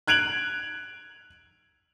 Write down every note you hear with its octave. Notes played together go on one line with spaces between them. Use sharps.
F#6 G#6 D7 F7 F#7